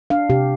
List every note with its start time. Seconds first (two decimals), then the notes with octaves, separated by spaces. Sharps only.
0.10 D4 F5
0.30 C3 G4